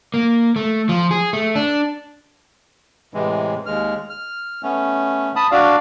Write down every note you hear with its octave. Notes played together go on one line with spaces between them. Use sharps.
A#3
A3
F3
G#4
A3
D4
A2 C3 E3 G#3
D#2 G#3 F6
F6
A3 B3 C#4
A5 B5 D#6
D4 F#4 D5 F5